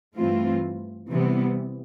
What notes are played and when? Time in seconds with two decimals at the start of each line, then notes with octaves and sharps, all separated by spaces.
0.17 G2 E3 A3 C4 F4
1.09 C3 E3 G3 B3